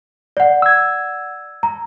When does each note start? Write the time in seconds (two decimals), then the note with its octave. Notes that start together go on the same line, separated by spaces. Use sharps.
0.37 D5 F#5
0.62 E6 G#6
1.63 A#5